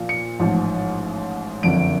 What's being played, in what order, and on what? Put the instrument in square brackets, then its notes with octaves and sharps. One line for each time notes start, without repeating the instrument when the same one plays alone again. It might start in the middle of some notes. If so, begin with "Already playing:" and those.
Already playing: [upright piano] A#2 F3
C#7
A1 G#2 F3
F#1 F2 D3 F3 D7